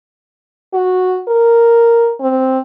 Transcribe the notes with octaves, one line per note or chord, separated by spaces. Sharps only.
F#4
A#4
C4